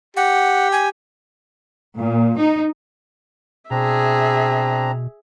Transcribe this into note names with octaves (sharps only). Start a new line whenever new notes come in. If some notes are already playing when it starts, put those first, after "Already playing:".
G4 F#5
G#5
A#2
D#4
B2 C4 D4 G#4 E5 A#5